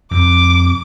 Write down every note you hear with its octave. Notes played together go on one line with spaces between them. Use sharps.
F1 F2 D6